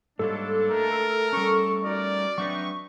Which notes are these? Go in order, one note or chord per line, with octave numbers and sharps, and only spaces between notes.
G#2 G3 G#3 A#3 D4 A4 C#5
A3 A#4
G3 A3 C#4 C#6
D#4 F#4 A#4 D5
F#3 A3 C4 D4 D#4 B4 C#6